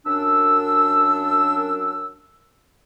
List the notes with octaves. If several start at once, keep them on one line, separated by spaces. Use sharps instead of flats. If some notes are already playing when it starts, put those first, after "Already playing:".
F#2 D4 E6